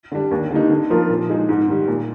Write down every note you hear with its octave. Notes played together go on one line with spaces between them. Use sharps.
D3 G3 D4
D#2
D3 G3 A#3 D#4
D3
F3 A#3 F4 A#4
A#2
G#3 D#4 G#4
G#2
D#3 G3
A#2